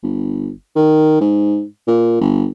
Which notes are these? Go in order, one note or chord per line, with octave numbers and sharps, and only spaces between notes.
G1
D#3
G#2
A#2
G1